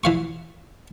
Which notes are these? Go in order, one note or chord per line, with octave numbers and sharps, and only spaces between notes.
E3 F5 C#6